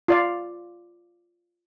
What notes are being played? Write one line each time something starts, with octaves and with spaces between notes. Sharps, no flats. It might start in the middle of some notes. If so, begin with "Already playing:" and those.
F4 D5 F5